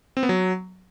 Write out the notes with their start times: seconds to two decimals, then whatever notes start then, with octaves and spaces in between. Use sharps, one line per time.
0.17 C4
0.23 B3
0.29 F#3